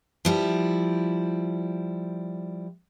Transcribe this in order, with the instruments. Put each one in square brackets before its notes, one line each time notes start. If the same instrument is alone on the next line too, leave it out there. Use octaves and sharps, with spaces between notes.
[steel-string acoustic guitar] F3 G3 E4